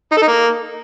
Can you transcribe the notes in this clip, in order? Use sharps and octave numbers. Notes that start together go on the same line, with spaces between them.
D#4
A4
D#4
A#3